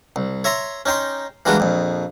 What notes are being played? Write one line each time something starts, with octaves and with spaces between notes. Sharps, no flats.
C2
C#5 E5 A#5 C6
C#4 D#4 G5 C6
E3 G3 G#3 A#3 D4 F#4
A#1 F2